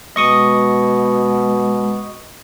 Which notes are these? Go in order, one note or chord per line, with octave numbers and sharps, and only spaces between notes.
B2 G#3 D#5 C#6 D#6